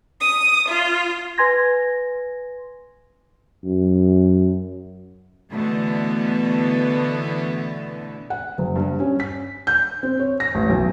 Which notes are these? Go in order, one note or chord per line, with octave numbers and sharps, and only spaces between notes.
D#6
F4
B4 G#5 C6 G#6 A#6
F#2
B2 D3 E3 A3 B3
F#5
F#1
G2
C#4
B6
G6
C4
C#5
A#6
A1
B1